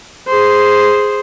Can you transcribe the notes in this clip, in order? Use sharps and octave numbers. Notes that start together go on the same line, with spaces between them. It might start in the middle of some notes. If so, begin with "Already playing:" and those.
G#4 C5